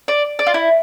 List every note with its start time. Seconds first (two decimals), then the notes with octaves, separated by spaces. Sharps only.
0.08 D5
0.39 D5
0.46 F4
0.54 E4